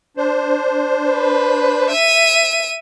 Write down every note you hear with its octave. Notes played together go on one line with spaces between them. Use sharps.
D4 C5
B4
E5 D#7